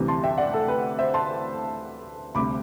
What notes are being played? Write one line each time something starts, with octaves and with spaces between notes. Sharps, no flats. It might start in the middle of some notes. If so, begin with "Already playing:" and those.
Already playing: D2 C3 E3 G3
A5 C6
E5 G5
D5 F#5
A4
B4
C5 E5
A5 C6
D2 C3 G3 B5 D6